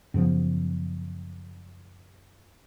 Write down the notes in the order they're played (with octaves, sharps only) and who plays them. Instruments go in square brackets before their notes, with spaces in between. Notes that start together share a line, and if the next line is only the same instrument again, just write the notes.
[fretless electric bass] F#2 C#3 F3 B3